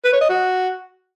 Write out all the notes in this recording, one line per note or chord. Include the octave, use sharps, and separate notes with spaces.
B4
C#5
D#5
F#4